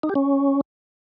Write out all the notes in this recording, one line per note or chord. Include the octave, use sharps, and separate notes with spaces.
D#4
G4
C#4